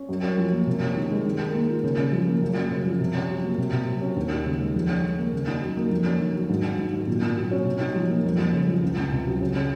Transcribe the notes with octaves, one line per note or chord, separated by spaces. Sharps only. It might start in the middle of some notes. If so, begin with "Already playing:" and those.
Already playing: C#4
F#2
C#4
F3
A#3
C3
C#4
D#3
G#3
D#3
A#4
A#3
F4
C#3
C#3
F3
A#3
F#2
F#2
C#3
F3
C3
C#4
F#3
A#3
C3
C3
F#3
C#4
D#2
D#4
C#3
G#3
F2
C#4
D#3
A#3
C#3
D#4
F#3
A#3
F2
C#4
D#3
F#3
G#2
G#2
D#3
F#3
A#2
A#2
F#3
C#4
C3
D#4
F3
A#3
F2
F2
C#3
F3
C#2
C#2
C3
F#3
C#3
C#3